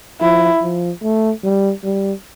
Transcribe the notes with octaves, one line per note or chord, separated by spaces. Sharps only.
F3 E4
F3
A3
G3
G3